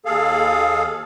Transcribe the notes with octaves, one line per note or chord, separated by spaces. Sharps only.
D#2 G#4 A4 F5